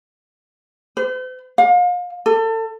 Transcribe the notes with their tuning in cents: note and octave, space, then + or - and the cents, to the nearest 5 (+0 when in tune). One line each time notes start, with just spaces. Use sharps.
C5 -45
F5 +35
A4 +30